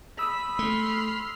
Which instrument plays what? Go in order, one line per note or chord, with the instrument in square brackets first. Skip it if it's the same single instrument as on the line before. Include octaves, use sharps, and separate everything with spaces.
[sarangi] B5 [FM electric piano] D#6 E6
[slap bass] A3 [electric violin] C6 F6